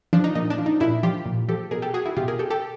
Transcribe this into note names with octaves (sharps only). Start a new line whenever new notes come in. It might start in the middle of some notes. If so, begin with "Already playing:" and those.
F3 D4
D#4
A#2 D#4
D4
F3
D#4
A#2 D4 E4
F3 F4 G4
A#2
F3 G4 A4
B2 G#4 A#4
G4 A4
F#4 G#4
E4 F#4
B2 F4 G4
G#4 A#4
G4 A4
G4 A4